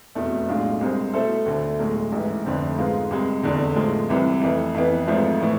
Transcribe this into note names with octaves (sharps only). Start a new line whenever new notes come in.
F1 E2 B2 A3
B1 A2 G#3 D4 F4
C2 C3 G#3 C4 G#4
B2 A3 E4 A4 C5
D2 D3 A3
B1 A2 G#3
A1 G#2 E3
F1 F2 D3 A3 C4
G#2 G#3 B3 F4
C2 C3 G#3
F1 E2 D3
A2 F3 G#3
C2 C3 E3
F2 E3 A3
F2 E3 B3
G#1 G#2 F3 A3
A2 E3